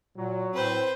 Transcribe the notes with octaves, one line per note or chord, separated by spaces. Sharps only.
A#2 F#3
A2 C4 B4 C5